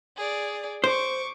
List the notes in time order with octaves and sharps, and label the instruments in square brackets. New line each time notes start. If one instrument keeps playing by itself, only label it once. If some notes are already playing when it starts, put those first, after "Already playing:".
[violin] G#4 D5
[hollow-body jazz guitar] C5 [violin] C#6 D6